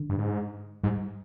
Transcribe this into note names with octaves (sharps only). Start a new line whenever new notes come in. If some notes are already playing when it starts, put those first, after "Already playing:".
Already playing: D3
G2
G#2
G#2 G3